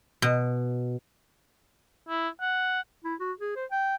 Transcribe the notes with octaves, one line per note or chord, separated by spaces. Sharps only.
B2
E4
F#5
E4
F#4
G#4
C5
G5